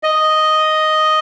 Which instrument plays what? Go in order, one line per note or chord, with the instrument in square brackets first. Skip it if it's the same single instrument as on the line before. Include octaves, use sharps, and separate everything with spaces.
[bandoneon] D#5